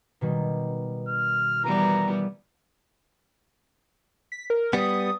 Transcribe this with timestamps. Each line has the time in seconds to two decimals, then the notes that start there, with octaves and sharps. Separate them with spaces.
0.21 B2 D#3 G3
1.09 F6
1.64 E3 G3 B3 A#4 A#5
4.32 B6
4.50 A#4
4.73 G3 B3 D#6